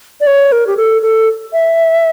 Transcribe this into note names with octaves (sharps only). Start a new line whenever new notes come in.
D5
C#5
A#4
G4
A4
A4
E5